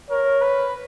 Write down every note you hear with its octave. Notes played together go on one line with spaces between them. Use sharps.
A#4 C#5
B4